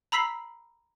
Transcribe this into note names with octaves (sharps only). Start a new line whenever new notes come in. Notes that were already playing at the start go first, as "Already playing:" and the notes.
A#5 B5 E6 B6 C7 F#7